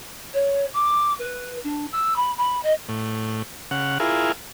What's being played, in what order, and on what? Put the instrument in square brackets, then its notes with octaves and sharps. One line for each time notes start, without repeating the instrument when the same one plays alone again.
[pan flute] C#5
D6
B4
D4
E6
B5
B5
D#5
[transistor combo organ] A2
C#3 F#5
E4 F4 G#4 A#4